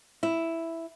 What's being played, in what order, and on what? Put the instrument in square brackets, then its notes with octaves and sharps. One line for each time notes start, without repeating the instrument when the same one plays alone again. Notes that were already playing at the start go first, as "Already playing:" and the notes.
[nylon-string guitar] E4